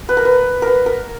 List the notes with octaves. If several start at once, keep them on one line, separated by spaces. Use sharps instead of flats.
B4
A#4
B4
A#4
B4
A#4